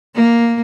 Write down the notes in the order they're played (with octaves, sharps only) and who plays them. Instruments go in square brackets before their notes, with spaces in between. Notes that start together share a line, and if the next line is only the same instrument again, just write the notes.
[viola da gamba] A#3